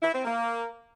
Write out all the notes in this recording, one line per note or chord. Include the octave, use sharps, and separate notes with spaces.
E4
C4
A#3